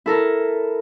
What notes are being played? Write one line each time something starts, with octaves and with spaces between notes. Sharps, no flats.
E4 A4 A#4